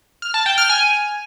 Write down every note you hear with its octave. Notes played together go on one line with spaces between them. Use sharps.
F6
A5
G5
F6
G#5